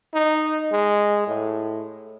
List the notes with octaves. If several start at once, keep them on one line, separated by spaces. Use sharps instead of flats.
D#4
G#3
A2